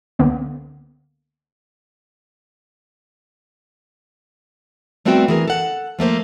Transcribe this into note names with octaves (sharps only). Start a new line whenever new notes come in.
C#2 D3 A#3 B3
G3 A3 B3 C4 F#4 G5
E3 G#4 A#4
A4 F#5
F3 A3 A#3 C5